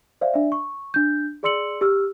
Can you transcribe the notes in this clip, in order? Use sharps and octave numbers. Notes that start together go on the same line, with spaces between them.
C5 D5 E5 F5
D4 D5 E5
C#6
D4 G6
G#4 D5 C6 E6 C#7 F#7
G4 E6 F6